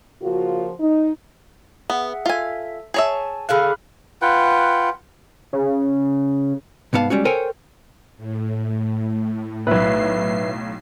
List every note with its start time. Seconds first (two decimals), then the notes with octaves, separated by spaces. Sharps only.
0.23 C#3 F3 A#3 F4 F#4
0.80 D#4
1.90 B3 G#4 E5 F#5
2.26 F4 A4 E5 G#5
2.94 G#4 C#5 E5 G#5 A5
3.49 D3 G#4 F5 B5 F6 F#6
4.22 F4 B4 F#5 G5
5.53 C#3
6.93 C2 G#2 B3 F5 A5
7.10 G3 G#3 C#4 F#4
7.25 A4 A#4 C5 C#5 G5 G#5
8.17 A2
9.67 B1 A2 B4 E5 C7